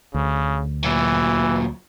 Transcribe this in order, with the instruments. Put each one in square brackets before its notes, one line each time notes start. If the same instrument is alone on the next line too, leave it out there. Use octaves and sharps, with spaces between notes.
[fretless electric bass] D2 [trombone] C#3
[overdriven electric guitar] A#2 F#3 [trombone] E3